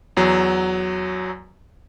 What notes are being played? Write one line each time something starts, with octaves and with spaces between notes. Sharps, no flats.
E2 F#3